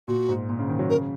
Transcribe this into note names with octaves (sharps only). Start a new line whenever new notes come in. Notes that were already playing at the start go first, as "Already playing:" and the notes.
A#2 F#4
G#2
A#2
C#3
D#3
F#3
C#3 A#4